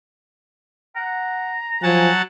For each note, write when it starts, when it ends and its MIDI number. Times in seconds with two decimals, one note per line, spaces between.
0.96 1.54 78
0.96 2.02 82
1.83 2.09 53
1.83 2.22 54
1.83 2.22 78
1.83 2.11 80
1.83 2.22 81